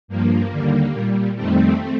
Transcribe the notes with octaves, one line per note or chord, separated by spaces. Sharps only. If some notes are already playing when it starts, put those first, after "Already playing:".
G2 F3 A#3
D#2 D3 G3
A#2 G3
F2 D#3 G3 A3 C4